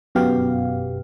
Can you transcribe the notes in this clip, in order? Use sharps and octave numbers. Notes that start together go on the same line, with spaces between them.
G1 F#2 B2 B3 G4 F5